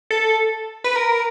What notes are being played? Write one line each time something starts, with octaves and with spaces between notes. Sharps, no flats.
A4
B4
A#4